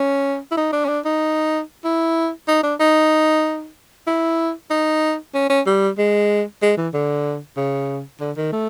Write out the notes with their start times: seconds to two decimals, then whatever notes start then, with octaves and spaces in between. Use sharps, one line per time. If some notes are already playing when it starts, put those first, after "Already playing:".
Already playing: C#4
0.51 E4
0.57 D#4
0.72 D4
0.84 C#4
0.88 D4
1.05 D#4
1.84 E4
2.47 D#4
2.63 D4
2.80 D#4
4.07 E4
4.70 D#4
5.34 C#4
5.49 C#4
5.66 G3
5.98 G#3
6.62 G#3
6.77 E3
6.93 D3
7.57 C#3
8.20 D3
8.36 D#3
8.52 A3